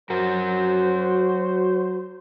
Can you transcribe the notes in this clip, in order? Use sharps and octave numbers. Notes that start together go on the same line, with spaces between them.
F#3 F#4 A#4 C5